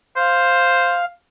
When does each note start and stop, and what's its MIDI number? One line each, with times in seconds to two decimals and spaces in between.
0.17 1.00 72
0.17 1.05 77